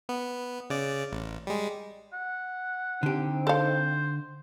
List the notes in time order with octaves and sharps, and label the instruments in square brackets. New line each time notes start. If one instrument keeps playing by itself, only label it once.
[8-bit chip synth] B3
C#3 D5
A1
G3 G#3
[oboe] F#5
[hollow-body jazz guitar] D3 G4 [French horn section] C4 D#4
[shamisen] A4 F5 [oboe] C5